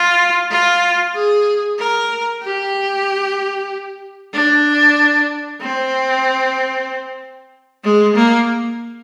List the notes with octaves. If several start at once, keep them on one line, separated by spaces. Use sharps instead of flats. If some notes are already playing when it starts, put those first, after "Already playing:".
Already playing: F4
F4
G#4
A#4
G4
D4
C4
G#3
A#3